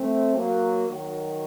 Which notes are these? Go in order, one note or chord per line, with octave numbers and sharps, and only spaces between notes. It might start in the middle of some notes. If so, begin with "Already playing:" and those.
Already playing: A3 C4
F#3 A#3
D#3 F#3